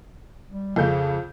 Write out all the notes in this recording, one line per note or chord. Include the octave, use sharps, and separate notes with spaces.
G3
F2 C#3 A4 G6